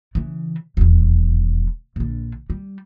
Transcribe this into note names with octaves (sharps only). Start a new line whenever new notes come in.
C#3 E3
D#1 E2
A#1 D3
G3